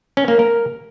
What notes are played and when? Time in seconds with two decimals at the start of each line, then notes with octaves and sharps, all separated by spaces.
0.17 C#4
0.28 A#3
0.39 A#4